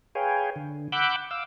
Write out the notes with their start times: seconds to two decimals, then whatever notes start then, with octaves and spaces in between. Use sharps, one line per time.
0.15 G#4 B4 C#5 F5 G5 G#5
0.56 D3
0.92 F#5 B5 D6 E6 F#6 G6
1.31 F5 D6 E6